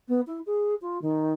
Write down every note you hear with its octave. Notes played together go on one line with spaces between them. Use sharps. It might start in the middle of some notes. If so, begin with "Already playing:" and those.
B3
E4
G#4
F4
D#3